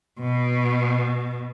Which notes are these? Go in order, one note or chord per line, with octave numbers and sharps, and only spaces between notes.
B2